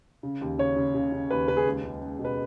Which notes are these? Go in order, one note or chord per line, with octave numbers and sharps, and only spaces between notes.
C#3
D#2
C#3 C#5
C#3
C#3
C#3
D#2 B4
C#3 B4
G#4
C#2
C#2
C#2
B2
B4